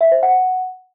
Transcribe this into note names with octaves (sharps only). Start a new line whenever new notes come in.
E5
C5
F#5